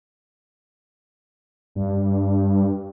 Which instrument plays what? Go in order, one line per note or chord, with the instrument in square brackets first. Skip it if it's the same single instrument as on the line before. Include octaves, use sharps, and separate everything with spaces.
[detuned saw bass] G2